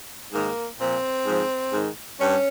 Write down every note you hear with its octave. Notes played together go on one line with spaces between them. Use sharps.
G#2 D#3 A#3
A#2 F3 C4
G#2 F3
G#2 D#3
G2 C#4